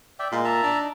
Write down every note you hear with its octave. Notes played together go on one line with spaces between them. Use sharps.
D5 E5 G5
A#2 G#3
E5 A5 A#5
D4
D#4